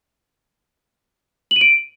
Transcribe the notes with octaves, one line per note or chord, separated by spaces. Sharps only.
F#7
D#7
D7